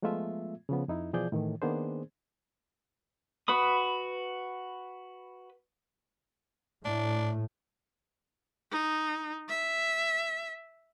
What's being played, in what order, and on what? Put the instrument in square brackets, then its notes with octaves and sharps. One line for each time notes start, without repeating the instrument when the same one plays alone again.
[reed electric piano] F3 G#3 A3 B3 F4 E5
C#3 F3 B3
F2 D#4 E4
B2 E3 F3 G#4 D5 G6
A2 D#3 E3
D#3 A#3 B3 D4 G#4 C5
[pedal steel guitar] F#4 B4 B5 D#6
[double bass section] A2 [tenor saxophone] D4
[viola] D#4
E5